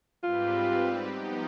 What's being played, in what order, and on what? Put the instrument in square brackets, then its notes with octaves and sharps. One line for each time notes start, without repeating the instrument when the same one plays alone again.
[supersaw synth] G#2 G3 C4 G4 B4 [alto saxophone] F4
[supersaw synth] F3 B3 D#4 G4